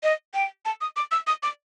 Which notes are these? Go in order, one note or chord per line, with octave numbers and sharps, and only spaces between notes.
D#5
G5
A5
D#6
D6
E6
D#6
D6